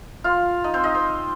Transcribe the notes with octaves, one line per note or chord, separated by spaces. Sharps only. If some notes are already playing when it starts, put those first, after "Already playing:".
F4 F5
D#4 D#5
C4 C5
D#4 D#5
C4 C5